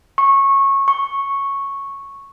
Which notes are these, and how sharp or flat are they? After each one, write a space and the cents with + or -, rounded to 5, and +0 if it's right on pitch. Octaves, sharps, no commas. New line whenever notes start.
C#6 -15
C#6 -5